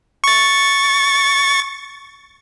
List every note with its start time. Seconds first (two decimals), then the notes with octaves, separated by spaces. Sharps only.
0.24 C#6 A6